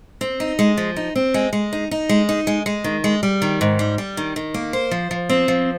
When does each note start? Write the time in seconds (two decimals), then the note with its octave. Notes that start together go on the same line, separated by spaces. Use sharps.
0.21 C4
0.40 D#4
0.59 G#3
0.77 F3
0.96 D#4
1.16 C4
1.34 G#3
1.53 G#3
1.73 D#4
1.91 D#4
2.09 G#3
2.29 D#4
2.47 G#3
2.66 G#3
2.84 D#3
3.04 G#3
3.23 G3
3.42 D#3
3.61 G#2
3.79 G3
3.98 G3
4.17 D#3
4.36 D#3
4.54 A#3
4.73 C5
4.91 F3
5.11 F3
5.29 C4
5.48 F3